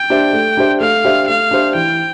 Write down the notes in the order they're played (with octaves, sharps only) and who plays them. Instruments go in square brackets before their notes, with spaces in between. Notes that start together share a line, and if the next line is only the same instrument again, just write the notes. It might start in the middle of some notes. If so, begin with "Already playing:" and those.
Already playing: [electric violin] G5
[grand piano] D4 G4 C5 E5
A3
D4 G4 C5 E5
[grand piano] A3 [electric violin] F5
[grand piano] D4 G4 C5 E5
[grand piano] A3 [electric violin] F5
[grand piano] D4 G4 C5 E5
[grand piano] E3 [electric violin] G5